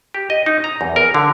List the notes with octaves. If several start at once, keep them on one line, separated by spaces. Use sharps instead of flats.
G4
D#5
D#4
A#5
E2
A#4
D3